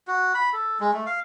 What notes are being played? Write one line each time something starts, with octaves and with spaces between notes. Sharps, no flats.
F#4
B5
A4
G#3
A3
F5